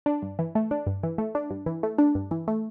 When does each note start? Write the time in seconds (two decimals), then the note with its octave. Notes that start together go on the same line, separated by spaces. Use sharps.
0.06 D4
0.22 G2
0.39 E3
0.55 A3
0.71 D4
0.87 G2
1.03 E3
1.18 A3
1.35 D4
1.50 G2
1.66 E3
1.83 A3
1.98 D4
2.15 G2
2.31 E3
2.48 A3